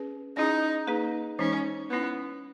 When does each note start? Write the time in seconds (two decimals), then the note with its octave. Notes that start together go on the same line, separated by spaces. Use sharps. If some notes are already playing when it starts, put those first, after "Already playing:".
Already playing: C#4 G#4 B4
0.37 C#4 D#4 E4 G#4
0.87 A#3 D#4 G#4 B4
1.39 E3 G#3 C#4 D#4
1.90 B3 C#4 E4 B4